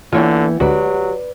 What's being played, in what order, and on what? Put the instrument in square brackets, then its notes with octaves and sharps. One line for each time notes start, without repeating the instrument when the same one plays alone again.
[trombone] D3 [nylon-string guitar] E3 B3 G5 [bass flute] A#3 [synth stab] F4 C#5
[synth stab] D2 G#3 F#4 [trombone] F#3 [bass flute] G4 [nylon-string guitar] B4 D5